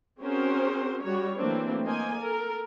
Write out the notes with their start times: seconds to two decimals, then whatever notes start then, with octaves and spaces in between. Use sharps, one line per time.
0.20 C4 C#4 F#4 G#4 A#4 C5
1.03 G3 F#4 C#5
1.37 E3 F#3 A3 A#3 C4 D4
1.84 A#3 C5 D#5 G#5
2.17 A4 A#4